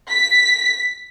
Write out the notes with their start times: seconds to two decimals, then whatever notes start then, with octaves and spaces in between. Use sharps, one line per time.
0.10 B6